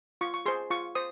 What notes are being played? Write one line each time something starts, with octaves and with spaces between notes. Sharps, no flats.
F4 C#6
C#6
G#4 C5 C6
F4 C#6
C5 D#6